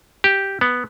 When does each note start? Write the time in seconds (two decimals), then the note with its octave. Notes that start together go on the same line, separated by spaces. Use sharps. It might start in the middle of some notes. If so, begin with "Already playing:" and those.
0.24 G4
0.61 B3